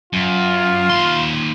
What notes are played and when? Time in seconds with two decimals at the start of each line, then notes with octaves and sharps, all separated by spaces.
0.13 F#2 F4
0.90 D#2 C6